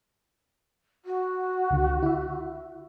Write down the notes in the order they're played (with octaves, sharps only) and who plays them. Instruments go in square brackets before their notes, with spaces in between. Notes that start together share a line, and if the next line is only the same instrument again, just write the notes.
[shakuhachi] F#4
[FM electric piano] C#2 D3
E4 E5